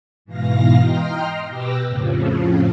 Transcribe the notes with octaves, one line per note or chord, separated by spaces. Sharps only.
G#2 B2 E3 F5 A#6
D#5 G5 A#5 C6 F6
B2 G4 B4 D6 E6 A#6
F2 A2 C#3 F3